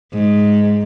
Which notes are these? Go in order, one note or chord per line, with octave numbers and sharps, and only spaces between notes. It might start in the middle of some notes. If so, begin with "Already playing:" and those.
G#2